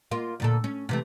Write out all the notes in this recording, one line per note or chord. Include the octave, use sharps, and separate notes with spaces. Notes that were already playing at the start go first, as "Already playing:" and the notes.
A#3 F4
D2 A#2 A4
C#4
C3 E3 A3